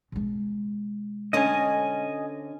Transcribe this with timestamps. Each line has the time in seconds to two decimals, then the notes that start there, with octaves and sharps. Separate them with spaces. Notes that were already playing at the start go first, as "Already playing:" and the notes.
0.12 B2 G#3
1.33 D2 D3 C#4 D#5 G#5